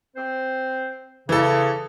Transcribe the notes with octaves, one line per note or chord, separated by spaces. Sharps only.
C4 C5
C#3 E3 A4